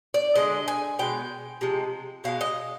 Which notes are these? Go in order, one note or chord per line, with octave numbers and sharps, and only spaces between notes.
D5
D3 G#3 D#5
G#5
B2 G#3 G5
C3 F3 G#3
B2 G#3 F5
D#5